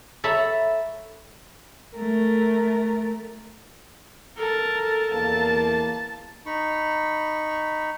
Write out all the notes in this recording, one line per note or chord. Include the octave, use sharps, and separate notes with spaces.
A4 C#5 E5 A#5 B5
A3 A#4
A4 A#4 A5
E2 A#3 A5
D#4 B5 C#6